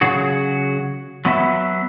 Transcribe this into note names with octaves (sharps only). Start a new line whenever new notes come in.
C#3 F#3 F#4 G#4
F#3 B3 E5